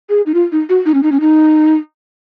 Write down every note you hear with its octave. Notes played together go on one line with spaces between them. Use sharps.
G#4
D#4
F4
D#4
F#4
D#4
C#4
D#4
C#4
D#4